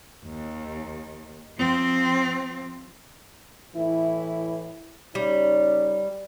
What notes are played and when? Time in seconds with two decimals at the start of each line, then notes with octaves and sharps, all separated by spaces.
0.26 D#2
1.58 F3 C4
3.75 A2 E3 E4
5.15 C#3 G3 D#4 C#5